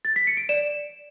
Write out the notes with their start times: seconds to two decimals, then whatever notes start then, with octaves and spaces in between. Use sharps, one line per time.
0.05 A6
0.16 B6
0.27 C#7
0.37 D7
0.49 D5 E7